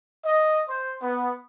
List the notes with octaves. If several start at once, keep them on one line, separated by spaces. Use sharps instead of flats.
D#5
C5
B3